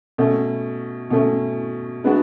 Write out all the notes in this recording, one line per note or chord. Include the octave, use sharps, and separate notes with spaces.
B2 A3 C#4
B2 A3 C#4
G#3 B3 D4 F#4